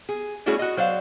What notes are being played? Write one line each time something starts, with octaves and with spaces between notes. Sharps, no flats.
G#4
G3 A3 C#4 E4 F#4 G#4
F#4 D#5
F#3 C5 D5 F5